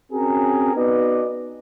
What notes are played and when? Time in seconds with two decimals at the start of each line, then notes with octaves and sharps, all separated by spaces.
0.12 C4 C#4 F#4 G#4 A#4
0.74 B3 D#4 F#4 B4 D5 D#5